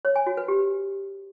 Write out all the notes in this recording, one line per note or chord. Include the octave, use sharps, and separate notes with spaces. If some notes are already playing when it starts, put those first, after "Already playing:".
C#5
G#5
F#4
B4
G4